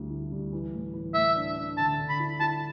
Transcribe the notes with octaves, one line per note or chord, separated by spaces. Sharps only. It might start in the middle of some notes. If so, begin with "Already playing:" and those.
Already playing: D2 D3 G3 E4
E4
G3
E3
A2
E3
A2 E5
D4
D4
D3 A5
D3
B5
E4
E4 A5